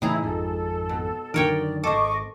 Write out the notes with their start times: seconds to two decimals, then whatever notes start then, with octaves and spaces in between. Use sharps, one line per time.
0.02 A2 C#3 E3 D#4 E4 G#4 A#5
0.23 G#1 F2 G#2 A4
0.89 B2
1.34 F#2 D3 D#3 A#4 C#5 D5 G5
1.84 D1 G#1 A4 C5 D#5 C#6 D6